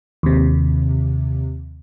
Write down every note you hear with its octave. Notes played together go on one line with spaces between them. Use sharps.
D#2 C3